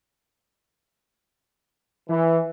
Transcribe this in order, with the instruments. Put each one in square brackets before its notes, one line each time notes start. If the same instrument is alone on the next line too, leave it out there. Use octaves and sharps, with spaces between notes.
[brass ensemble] E3